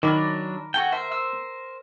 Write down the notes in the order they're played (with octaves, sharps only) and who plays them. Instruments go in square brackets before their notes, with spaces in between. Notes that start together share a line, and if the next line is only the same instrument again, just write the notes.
[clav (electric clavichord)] D#3 [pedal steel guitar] F#3 D4 [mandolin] A#4 B5 D6
[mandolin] F#4 A4 G#5 [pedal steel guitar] G5
[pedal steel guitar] A#4 C5 [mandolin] E5
[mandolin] E6